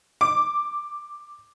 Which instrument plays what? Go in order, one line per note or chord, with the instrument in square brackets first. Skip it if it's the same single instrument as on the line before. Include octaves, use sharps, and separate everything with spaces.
[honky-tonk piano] D6